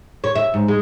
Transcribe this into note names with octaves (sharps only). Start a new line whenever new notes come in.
C#5
E5
G#2
G#3